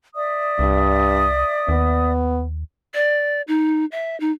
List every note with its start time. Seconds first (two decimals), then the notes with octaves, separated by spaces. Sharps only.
0.15 D5 E5 D#6
0.59 C2 G2
1.69 D#2 B3
2.94 D5
3.48 D#4
3.92 E5
4.20 D#4